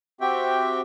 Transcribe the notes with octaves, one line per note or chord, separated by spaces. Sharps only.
C4 F#4 G4 E5 G5